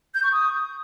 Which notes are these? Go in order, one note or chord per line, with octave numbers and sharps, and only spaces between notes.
G6
C#6
D#6